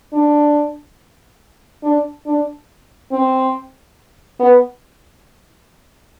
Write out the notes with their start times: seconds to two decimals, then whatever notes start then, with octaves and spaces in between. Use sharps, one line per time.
0.13 D4
1.83 D4
2.26 D4
3.12 C4
4.39 B3